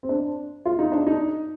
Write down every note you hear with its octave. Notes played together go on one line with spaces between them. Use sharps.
C4
D4
F4
D#4
D4
D#4